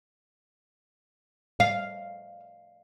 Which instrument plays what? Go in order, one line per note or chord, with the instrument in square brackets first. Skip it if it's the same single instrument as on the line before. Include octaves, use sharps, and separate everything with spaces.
[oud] F5